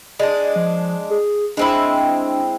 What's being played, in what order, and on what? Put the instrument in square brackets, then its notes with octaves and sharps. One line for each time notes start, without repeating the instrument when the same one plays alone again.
[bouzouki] G#3 D4 [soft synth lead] D5
[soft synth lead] F3
G#4
[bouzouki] G#3 C4 E4 [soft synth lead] D4